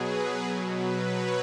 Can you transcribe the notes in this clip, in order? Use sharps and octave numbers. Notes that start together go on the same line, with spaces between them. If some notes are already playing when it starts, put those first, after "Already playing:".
Already playing: B2 F#3 G#4 B4
B4
B2 F#3 A#4
B4
C#5